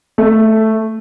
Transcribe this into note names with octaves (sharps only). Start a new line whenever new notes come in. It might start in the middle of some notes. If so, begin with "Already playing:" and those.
A3